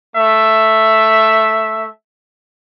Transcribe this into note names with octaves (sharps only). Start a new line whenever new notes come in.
A3 E5